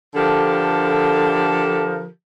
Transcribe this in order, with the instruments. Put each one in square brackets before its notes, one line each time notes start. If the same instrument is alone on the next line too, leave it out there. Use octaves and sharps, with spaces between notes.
[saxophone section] D3 F3 G4 A4 A#4